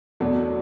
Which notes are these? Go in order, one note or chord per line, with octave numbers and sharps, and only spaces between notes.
E2 B2 F#3 A3 D4